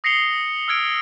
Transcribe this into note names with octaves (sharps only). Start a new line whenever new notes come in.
D#6 A#6 C7 C#7 F7 G7
E6 F6 G#6 D7 G7